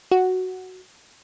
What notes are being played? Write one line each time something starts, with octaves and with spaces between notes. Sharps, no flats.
F#4